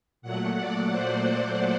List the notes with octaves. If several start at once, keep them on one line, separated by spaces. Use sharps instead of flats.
A#2 F#3 A3 F#5
D5
C5